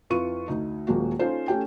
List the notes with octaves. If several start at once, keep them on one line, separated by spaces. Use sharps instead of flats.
F2 E4 F4 B4 C#6 D#7
D2 D#4
D#1 G#3 A#3 F#4
C#4 D#4 F4 A4 C5
A3 C#4 G4 G5